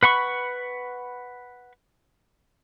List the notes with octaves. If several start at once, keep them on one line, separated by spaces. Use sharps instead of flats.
B4 F#5 B5 C#6